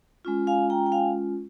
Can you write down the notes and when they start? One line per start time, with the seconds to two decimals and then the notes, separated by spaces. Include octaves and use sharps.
0.25 G#3 C#4 F4
0.47 F5 G#5
0.70 G5 A#5
0.86 G5
0.92 F5 G#5